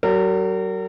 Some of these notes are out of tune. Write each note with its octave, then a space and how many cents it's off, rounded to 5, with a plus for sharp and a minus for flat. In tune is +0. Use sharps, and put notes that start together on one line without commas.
F#3 +40 A#4 -35